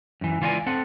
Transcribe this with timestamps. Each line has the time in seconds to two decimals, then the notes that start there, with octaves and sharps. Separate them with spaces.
0.21 F#2 E3
0.41 C#2 E3 F4 C#5 D5 G#5
0.66 C4 A4 F#5